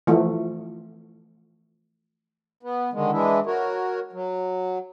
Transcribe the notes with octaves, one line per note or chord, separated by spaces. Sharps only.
E3 F3 A3
B3
D3 D#3 G#3
E3 G#3 D4 E4
F#4 A#4 C#5
F#3